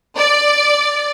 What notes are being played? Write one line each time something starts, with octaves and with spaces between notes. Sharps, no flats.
D5